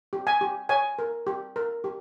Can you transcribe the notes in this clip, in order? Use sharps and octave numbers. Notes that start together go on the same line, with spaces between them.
G4
G#5
G4
C#5 G#5
A#4
G4
A#4
G4